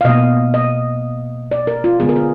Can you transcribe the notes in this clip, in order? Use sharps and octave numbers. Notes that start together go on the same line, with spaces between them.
F5
B2 A#3 D#5
D#5
D5
A#4
F4
D3 G#3 B3 G#4
A#4
G#4